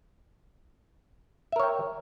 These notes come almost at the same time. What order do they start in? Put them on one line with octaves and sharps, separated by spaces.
E5 A#4 C#5 G5